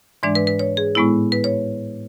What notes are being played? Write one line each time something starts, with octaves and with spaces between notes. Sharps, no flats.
G#2 E3 G#3 D4 D5
B4
B4
C#5
G#4
A2 G#3 B3 E4
B4
C#5